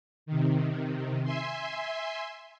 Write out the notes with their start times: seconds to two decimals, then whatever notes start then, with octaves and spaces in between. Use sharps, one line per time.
0.26 C3 D#3
1.24 E5 G#5 C6